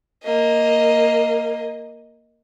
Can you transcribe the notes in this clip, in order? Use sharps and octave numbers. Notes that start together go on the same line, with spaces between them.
A#3 D#5